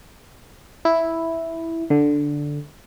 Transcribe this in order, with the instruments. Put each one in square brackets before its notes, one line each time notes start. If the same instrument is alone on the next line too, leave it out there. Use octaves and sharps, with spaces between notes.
[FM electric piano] E4
D3